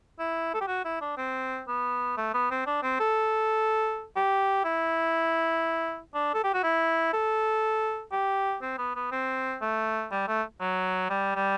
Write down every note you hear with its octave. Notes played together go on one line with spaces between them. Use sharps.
E4
A4
G4
F#4
E4
D4
C4
B3
A3
B3
C4
D4
C4
A4
G4
E4
D4
A4
G4
F#4
E4
A4
G4
C4
B3
B3
C4
A3
G3
A3
F#3
G3
G3